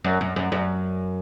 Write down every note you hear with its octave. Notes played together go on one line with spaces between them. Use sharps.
F#2
F#2
F#2
F#2